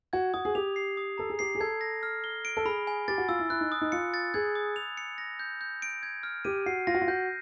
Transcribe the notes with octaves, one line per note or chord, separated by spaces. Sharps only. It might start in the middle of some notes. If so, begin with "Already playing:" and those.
F#4 G#6
F#4 D#6
G#4
G4 F7
C7
D#6
A4 A#5
G#4
G4 C7
G#4
A4 G#6
A#6
F6
G7
D7
A4
G#4 B5
G#5
G4 A6
F#4
F4 E6
E4
E4 F#6
D#4
D#6
D#4
F4 C#7
A6
G#4 G#6
D#6
F7
C#7
A#6
G6
G6
D7
G#6
F6
G4 D#7
F#4 C7
F4 A#6
F#4
F4
F#4 G6